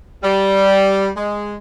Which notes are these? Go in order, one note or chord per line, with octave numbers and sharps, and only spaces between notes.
G3
G#3